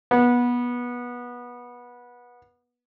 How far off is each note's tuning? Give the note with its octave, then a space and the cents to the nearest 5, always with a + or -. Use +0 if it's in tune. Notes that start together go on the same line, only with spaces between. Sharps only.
B3 -20